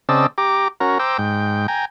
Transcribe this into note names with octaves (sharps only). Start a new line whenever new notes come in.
C#3 C4 D5 D#5 A5 E6
G4 A#5 D6
C#4 F#4 A#4 A#5
C5 G5 A#5 D6 E6
G#2 G5
G5 G#5 A#5